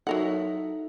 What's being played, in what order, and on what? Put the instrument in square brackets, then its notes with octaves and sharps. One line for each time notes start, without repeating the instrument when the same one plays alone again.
[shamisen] F#3 A#4 F#5 [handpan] D#4 A4 E5